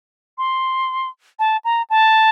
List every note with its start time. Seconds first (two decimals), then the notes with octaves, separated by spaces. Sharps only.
0.38 C6
1.39 A5
1.65 A#5
1.90 A5